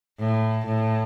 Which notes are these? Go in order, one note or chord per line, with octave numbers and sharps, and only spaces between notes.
A2
A2